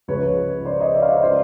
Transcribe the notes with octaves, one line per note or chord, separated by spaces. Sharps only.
C#2 C#3 F3 G#3 B4 C#5
C5 D5
C#5 D#5
D5 E5
F5
D5 E5
D#5
C#3 C5 D5